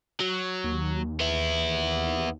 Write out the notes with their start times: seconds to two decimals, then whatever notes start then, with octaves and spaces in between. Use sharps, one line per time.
0.20 F#3
0.64 D#2
1.20 B3 E4